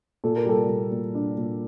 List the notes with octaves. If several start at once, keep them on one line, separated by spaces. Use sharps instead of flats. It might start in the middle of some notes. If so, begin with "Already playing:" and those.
A#2 A4
A#4
G3 A4
A#2
A#2
D4
A#2